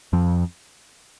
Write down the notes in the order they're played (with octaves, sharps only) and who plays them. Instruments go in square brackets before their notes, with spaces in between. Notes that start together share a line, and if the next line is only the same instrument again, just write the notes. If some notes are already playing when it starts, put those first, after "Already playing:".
[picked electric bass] F2 F3